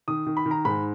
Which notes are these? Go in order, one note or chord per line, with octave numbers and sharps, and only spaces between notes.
D#3 D#6
D#3
B5
D#3
A#5
G#2 B5